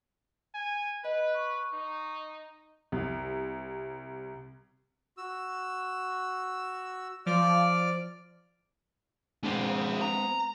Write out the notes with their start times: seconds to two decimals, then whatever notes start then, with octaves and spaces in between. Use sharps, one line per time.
0.55 G#5
1.05 B4 D#5
1.34 C#6
1.73 D#4
2.92 C2
5.17 F#4 E6
7.26 F3 D5 D6 F6
9.44 G#3 B3 C4 D4 G#4
10.02 A#5